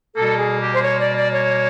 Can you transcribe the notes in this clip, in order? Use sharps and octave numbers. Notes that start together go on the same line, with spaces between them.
B2 G3 A#3 A4
G#4
G4
C5
C#5
D5
D5
C#5